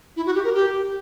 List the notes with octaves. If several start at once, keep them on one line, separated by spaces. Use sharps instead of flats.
E4
F#4
G4
A#4
G4